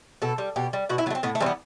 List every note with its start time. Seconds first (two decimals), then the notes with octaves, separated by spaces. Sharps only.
0.22 B2 A4
0.38 G3
0.56 B2 G4
0.73 G3
0.89 B2 F#4
0.98 E4
1.06 F#3 B3
1.10 A3
1.15 C4
1.23 A2 B3
1.35 A3
1.40 E3 G3 C4
1.46 B3